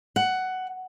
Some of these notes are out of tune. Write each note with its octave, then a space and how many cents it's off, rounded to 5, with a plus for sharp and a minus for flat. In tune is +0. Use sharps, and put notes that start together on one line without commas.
F#5 +10